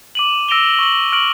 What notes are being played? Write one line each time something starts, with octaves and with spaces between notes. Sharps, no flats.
D6 D#7 F#7
E6 A#6 D7 E7 F7 G7
C#6 E6 F#7
C#6 F6 D7 F#7